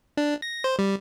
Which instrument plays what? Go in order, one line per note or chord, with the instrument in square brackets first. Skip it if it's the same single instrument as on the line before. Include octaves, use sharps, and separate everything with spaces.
[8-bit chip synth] D4
A#6
C5
G3